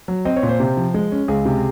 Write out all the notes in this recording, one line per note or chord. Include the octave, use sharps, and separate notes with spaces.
F#3
C4 D#5
C#5
A#2
C5
C3
F3
G#3
C#4
C#2 G#4
C3